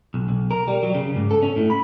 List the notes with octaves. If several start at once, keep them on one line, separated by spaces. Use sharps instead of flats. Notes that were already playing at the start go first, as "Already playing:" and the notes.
B1
B1
A#4
G3
F#3
C#3
G#2
A4
C#4
A2
B5